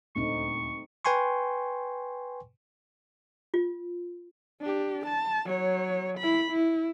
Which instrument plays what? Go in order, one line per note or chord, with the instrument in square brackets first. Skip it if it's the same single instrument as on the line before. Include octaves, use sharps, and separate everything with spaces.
[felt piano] D#1 D2 [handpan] A3 C4 D#4 [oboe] C#6
[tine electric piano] B4 G5 G#5 C6 C#6
[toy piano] F4
[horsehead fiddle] D4 G4
A5
F#3 C#5
E4 B5
E4